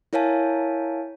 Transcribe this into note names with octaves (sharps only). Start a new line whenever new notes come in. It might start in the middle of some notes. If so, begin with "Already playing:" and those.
E4 A#4 C#5 F5 G#5 A5